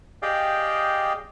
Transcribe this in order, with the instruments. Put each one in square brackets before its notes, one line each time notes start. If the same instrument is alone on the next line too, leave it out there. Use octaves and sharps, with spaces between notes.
[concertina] G4 G#4 D5 D#5 F5 G5